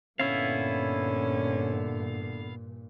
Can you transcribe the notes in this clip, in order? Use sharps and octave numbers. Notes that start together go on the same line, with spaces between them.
G2 A#2 D3 B3 C#4 E4 F5